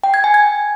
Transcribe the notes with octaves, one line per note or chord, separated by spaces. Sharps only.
G5
G#6
G#5
G#6